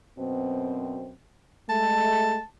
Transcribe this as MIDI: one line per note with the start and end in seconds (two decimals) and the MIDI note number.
0.19 1.12 42
0.19 1.12 47
0.19 1.12 60
1.70 2.39 56
1.70 2.39 57
1.70 2.44 81